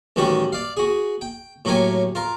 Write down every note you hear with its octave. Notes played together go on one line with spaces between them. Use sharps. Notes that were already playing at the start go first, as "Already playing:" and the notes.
A1 D#3 G3 F#4 G4
D5 F5
F#4 G#4
G5
A2 F#3 A#3 G4 C#5 G#5
F4 A#4